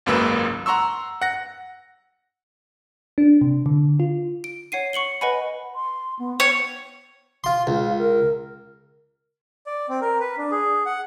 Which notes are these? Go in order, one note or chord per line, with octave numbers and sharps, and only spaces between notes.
G#1 C#2 F#2 A#3 B4 E6
F#5 A#5 C6 C#6 E6
F#5 A#6
D4
C3
D3
F4
D7
C#5 F#5 C7 D#7
C#6 C#7 F#7 G7
B4 D#5 F#5 G#5 B5
C6
B3
C#5 G5
F4 C6
C#2 F4
A#4
D5
C4
A#4
B4
D4
G#4
F#5